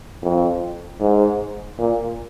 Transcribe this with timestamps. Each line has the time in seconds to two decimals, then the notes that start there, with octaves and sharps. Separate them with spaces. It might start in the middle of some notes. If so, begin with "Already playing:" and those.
0.22 F2
1.01 G#2
1.78 A#2